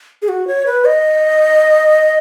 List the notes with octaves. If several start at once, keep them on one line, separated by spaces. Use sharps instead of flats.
G#4
F#4
C#5
B4
D#5